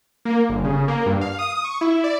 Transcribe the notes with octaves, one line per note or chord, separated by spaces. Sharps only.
A#3
G1
C#3
A#3
G2
F5
D#6
C#6
E4
D5